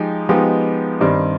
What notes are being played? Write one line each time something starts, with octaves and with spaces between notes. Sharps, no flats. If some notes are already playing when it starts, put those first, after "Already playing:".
Already playing: F3 G#3 D#4 G4
F3 G#3 B3 D#4 G4
G2 D#3 G3 C4